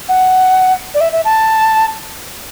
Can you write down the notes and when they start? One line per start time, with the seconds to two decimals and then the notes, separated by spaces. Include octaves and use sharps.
0.09 F#5
0.94 D5
1.00 E5
1.12 E5
1.25 A5